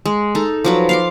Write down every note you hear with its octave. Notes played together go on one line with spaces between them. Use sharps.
G#3
D#4 A4
F3 F#3 B4
F5 C6 D6